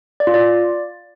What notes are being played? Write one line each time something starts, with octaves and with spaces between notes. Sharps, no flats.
D5
F4
D5